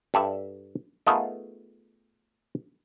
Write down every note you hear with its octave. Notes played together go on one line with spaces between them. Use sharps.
G2 A4 D5 E5
A3 B3 D#4 F4 G#4 A#4